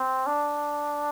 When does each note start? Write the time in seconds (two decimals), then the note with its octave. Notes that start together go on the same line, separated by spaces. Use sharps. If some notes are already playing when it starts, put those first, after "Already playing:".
Already playing: C4
0.27 D4